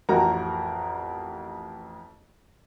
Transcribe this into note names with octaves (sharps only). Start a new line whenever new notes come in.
A1 F2 F#4 A#4 A#5